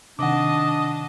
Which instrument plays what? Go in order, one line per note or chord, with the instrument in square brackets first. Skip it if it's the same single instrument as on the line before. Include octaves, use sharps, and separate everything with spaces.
[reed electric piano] C3 D#3 [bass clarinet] D4 [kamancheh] D#5 A5 [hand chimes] F#5 D6